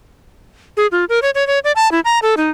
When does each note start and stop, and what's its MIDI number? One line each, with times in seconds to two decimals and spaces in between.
0.77 0.87 68
0.92 1.05 65
1.09 1.19 70
1.22 1.30 73
1.35 1.46 73
1.47 1.59 73
1.64 1.72 74
1.76 1.90 81
1.92 2.00 64
2.05 2.19 82
2.22 2.35 69
2.37 2.50 63